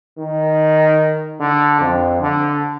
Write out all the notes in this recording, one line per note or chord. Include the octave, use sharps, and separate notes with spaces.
D#3
D3
F2
D3